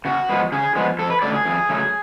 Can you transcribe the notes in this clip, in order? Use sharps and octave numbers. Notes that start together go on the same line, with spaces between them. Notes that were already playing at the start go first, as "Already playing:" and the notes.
C#3 F#4
F3 G#3 B3
C#3 G#4
F3 G#3 B3
F2 A4
B4
C#3 F#3 A3 D5
G#4
F2
C#3 F#3 A3